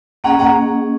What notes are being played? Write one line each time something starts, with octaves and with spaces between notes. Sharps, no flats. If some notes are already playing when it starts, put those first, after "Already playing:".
A#3 C#4 G#4 D#5 F#5 A#5
F#5 A#5